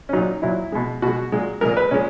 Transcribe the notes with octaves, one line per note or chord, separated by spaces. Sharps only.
C#4
A#2 F#3 D#4
A#2 F#3 E4
B2 G#3
B2 G#3 F#4
A#2 G#3
A#2 G#3 A#4
B4
A#2 G#3 C#4